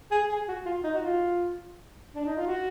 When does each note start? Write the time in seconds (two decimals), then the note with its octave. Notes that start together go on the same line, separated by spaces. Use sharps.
0.11 G#4
0.29 G#4
0.48 F#4
0.66 F4
0.84 D#4
0.94 F#4
1.02 F4
2.15 D4
2.26 D#4
2.37 F4
2.47 F#4